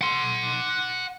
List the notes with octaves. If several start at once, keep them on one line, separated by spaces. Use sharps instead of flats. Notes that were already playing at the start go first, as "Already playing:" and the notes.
F#5 C6